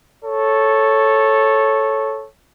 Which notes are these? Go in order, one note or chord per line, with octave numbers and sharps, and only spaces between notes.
A4 C#5